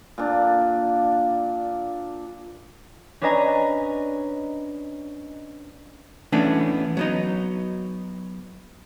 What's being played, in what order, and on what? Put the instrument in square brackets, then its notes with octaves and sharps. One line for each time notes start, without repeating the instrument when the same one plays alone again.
[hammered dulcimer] A#2 D4
[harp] C#4 D4 B4 D#5 G#5 A#5
[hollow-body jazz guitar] E3 A3 B3 C#4 D4
F#3 B3 D#4